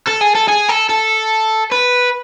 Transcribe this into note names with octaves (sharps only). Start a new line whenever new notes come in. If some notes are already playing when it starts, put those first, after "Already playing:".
A4
G#4
A4
G#4
A4
A4
B4